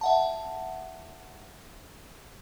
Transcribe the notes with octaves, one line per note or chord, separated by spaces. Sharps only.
E5 F#5 A5